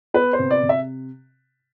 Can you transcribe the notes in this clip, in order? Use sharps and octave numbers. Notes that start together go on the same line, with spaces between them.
B3 B4
C5
C3
D5
C3
E5